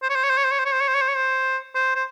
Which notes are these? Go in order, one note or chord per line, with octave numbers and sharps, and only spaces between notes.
C5
C#5
C5
C#5
C5
C#5
C5
C#5
C5
C#5
C5
C#5
C5
C#5
C5
C#5
C5
C5
C5